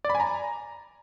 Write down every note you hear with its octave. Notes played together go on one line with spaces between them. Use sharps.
D5
B5
G#5
A#5